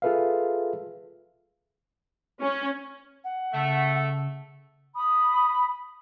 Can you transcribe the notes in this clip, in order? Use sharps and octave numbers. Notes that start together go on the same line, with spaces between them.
F4 G#4 A4 B4 E5 F5
C#4
F#5
C#3 A3
B5 D#6